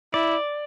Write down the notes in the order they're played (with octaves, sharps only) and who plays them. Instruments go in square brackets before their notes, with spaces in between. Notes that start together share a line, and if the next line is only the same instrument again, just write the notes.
[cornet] E4 [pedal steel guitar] D5